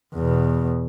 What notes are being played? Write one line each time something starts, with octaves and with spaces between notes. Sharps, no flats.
E2 B2